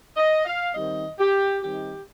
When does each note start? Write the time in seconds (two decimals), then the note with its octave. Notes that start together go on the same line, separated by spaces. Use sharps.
0.17 D#5
0.45 F5
0.74 D#3 G3 C4 D#4 D#5
1.19 G4
1.62 D#3 G3 C4 D#4 G4